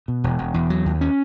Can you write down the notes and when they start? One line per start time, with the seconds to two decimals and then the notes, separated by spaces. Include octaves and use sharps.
0.08 B2
0.24 E1
0.39 E1
0.54 E2
0.70 F#3
0.86 D#2
1.01 C#4